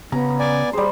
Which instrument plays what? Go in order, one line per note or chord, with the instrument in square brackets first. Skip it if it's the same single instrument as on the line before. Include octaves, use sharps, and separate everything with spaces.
[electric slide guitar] C#3 C#4 [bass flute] B3 [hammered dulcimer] A#5
[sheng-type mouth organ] D5 G#5
[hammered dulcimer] G3 C5 [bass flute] G#4